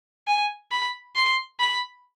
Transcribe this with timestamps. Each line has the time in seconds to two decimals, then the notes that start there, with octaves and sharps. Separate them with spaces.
0.27 G#5
0.71 B5
1.16 C6
1.60 B5